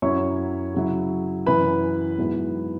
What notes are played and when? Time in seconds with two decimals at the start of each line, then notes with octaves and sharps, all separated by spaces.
0.02 F#2 F#3 E4 C#5 C#6
0.74 C#3 F#3 E4
1.46 F#2 E3 C#4 E4 B4 B5
2.18 G#2 F#3 B3 E4